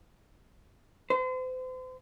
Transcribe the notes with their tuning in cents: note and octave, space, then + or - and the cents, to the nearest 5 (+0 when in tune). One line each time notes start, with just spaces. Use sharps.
C5 -40